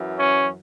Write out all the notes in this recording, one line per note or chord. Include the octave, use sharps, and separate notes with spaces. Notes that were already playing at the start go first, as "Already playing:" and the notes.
Already playing: F#2 E3
C#4